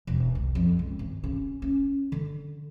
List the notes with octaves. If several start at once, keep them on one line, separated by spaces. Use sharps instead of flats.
E1
C2
F2
C#2
G#1
C#3
C#4
D3